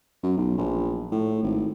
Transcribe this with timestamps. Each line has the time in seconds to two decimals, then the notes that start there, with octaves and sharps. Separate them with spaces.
0.23 F#2
0.37 B1
0.58 A#1
1.12 A2
1.43 G#1